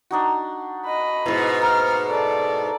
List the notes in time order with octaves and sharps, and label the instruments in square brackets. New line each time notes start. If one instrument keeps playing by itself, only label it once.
[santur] D4 D#4 F#4
[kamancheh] D#5 B5
[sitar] G#2 B2 [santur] E4
[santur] A#3 A#4 [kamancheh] F6
[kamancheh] A4 D5